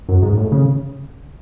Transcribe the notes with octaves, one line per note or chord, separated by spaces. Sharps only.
F#2
G#2
A2
C#3